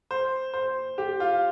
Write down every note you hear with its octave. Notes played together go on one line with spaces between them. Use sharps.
C5
C5
G4
F4